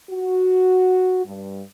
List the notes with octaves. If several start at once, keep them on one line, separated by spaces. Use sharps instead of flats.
F#4
G2